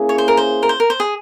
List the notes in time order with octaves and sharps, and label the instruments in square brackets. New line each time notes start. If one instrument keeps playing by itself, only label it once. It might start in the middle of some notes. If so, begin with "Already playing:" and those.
Already playing: [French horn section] A#3 C#4 E4 G#4
[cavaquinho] C#5
C5
A#4
C5
A#4
C5
A#4
C5
G#4